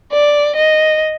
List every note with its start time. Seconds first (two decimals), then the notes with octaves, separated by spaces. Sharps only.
0.12 D5
0.56 D#5